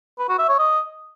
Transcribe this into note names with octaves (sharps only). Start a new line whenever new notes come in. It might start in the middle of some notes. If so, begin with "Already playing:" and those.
B4
F#4
E5
C#5
D#5